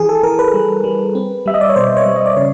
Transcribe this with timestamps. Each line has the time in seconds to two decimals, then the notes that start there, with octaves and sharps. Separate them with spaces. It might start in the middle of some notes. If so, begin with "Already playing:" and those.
Already playing: E3 G#4
0.09 A4
0.23 E3 A#4
0.39 B4
0.54 G3
0.84 G3
1.15 C4
1.46 G3 E5
1.54 D#5
1.61 D5
1.69 C#5
1.76 B2 C5
1.97 C#5
2.06 G3
2.16 D#5
2.26 D5
2.37 C#3 C#5